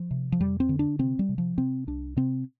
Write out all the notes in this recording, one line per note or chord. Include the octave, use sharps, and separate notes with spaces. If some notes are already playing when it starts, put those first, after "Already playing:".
Already playing: F3
C3
F3
F2 G3
C4
D3
D4
C3 C4
G3
C3
F3
C3 C4
C2 D4
C3 C4